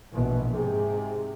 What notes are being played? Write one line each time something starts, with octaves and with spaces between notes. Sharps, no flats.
A#1 B2 E3
G#2 C3 G#4